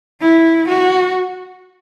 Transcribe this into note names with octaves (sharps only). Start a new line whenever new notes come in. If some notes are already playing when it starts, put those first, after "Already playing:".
E4
F#4